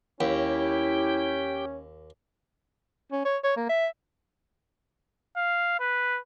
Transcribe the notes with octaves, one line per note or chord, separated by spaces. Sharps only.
D#2 C#4 E4 G4 G5
C#4
C#5
C#5
A#3
E5
F5
B4